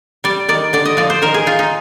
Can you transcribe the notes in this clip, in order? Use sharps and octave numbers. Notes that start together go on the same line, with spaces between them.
G3 D5
D#3 D5
D3 D5
D#5
F3 D5
C5
D#3 A#4
G#4
D#4 F4
D#4